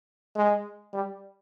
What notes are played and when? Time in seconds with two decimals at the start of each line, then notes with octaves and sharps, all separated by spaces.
0.36 G#3
0.93 G3